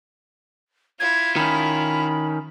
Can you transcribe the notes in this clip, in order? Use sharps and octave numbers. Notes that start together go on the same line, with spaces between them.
E4 F4 G#6
D#3 C#4 B5